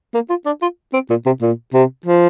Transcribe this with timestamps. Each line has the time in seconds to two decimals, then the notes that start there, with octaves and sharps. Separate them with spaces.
0.14 A#3
0.30 F4
0.46 D4
0.62 F4
0.93 C4
1.10 A#2
1.26 C3
1.42 A#2
1.74 C3
2.06 F3